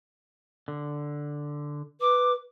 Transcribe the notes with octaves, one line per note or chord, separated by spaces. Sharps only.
D3
B4 D6